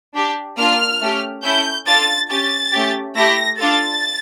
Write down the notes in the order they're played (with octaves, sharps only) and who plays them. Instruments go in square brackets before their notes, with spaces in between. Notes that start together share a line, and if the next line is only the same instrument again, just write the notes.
[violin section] D4 G4
A#3 D4 F4 F6
A3 C#4 G4
C#4 E4 A4 G6
D4 F4 A4 A6
C#4 G4 A6
A3 C#4 G4
A3 E4 G4 A#6
D4 F4 A4 A6